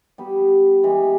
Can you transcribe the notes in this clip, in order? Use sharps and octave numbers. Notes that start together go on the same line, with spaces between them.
G3 B3 G4
E3 G#3 B3 G4